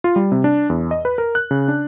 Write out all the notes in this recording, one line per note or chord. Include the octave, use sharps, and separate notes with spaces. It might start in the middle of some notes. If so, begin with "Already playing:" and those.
F4
G3
C3
D4
E2
D#5
B4
A#4
F#6
C#3
D4